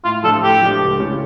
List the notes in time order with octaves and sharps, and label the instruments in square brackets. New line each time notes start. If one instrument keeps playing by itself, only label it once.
[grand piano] A2 [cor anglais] F4
[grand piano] F3 A3 D4 [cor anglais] A4
[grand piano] A2 [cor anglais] G4
[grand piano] F3 A3 D4
C#2
C#3 E3 A3 C#4